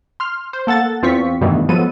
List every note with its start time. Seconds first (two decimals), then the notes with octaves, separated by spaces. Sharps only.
0.20 C6 F6
0.53 C5
0.67 A#3 A4 F#5 A6
1.02 E2 C4 F4 C#6 B6
1.41 G2 B2 D#3 E3 A3
1.69 F3 F#3 G#3 B3 A4 D#7